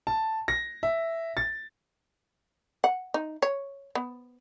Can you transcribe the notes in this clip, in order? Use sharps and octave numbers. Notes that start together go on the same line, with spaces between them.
A5
A#6
E5
A6
F#5
D#4
C#5
B3